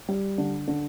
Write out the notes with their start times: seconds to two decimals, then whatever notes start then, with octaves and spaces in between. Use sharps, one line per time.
0.08 G3
0.38 D3
0.68 D3